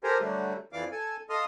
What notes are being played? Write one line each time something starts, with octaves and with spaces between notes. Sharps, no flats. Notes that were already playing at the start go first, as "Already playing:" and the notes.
G4 A4 A#4 C5 G#5
D3 F#3 G3 A3
F2 E3 D5 F5 D6
A4 G#5
A4 D#5 F5 C6 D#6